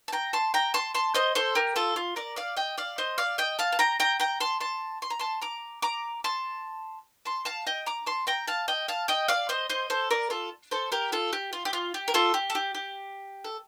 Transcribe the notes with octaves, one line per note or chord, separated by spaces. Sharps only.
A5
G5 A#5
A5 C6
G5 A#5
A5 C6
A5 C6
C5 D#5
A4 C5
G4 A#4
F4 A4
F4
A#4 D5
D5 F5
D#5 G5
D5 F5
C5 D#5
D5 F5
D#5 G5
F5 A5
A5
G5 A#5
G5 A#5
G5 A#5
A5 C6
A5 C6
C6
A#5
A5 C6
A#5 D6
A#5 D6
A5 C6
A5 C6
F5 A5
D#5 G5
A#5 D6
A5 C6
G5 A#5
F5 A5
D#5 G5
F5 A5
D#5 G5
D5 F5
C5 D#5
C5 D#5
A4 C5
A#4 D5
F4 A4
A4 C5
G4 A#4
F4 A4
G4
F4
G4
F4
G4
A#4
F4 A4
G4
A4
G4
G4
A4